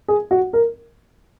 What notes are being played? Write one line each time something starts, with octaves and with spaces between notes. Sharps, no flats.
G#4
F#4
A#4